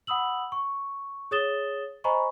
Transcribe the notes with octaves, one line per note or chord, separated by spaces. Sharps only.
F#5 B5 D#6 E6 F#7
C#6
G#4 C#5 D#6 A6 E7 G7
C5 D#5 G#5 A#5 B5 C#6